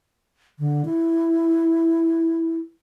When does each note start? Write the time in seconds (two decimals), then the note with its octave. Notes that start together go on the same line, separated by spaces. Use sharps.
0.59 D3
0.85 E4